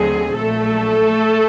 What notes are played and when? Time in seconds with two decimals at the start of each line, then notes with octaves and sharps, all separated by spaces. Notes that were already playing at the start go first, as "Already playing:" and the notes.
Already playing: D#2 D3 F#3 A3 C4 G#4
0.34 A#1 A#2 F#3 A3 A4